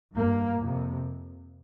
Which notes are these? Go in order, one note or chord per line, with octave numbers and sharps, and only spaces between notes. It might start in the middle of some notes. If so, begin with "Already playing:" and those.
G2 A#3
F2 C3